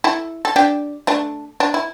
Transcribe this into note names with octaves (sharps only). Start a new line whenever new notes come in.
E4 A4
A4
D4 G4
A3 D4
D4
E4